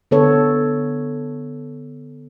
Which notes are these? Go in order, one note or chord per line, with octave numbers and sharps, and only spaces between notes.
D3 B3 A4 C#5